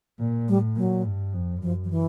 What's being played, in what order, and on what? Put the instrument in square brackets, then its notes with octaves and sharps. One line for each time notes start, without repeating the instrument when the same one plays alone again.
[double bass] A#2
[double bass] A2 [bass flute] G3
[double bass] A#2 [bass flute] F#3
[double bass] G2
F2
[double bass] F#2 [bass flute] F3
[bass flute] F3
E3